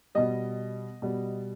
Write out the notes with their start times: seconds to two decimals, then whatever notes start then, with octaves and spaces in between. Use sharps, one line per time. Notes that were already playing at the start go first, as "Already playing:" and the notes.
0.15 B2 G3 D#5
1.02 B2 G3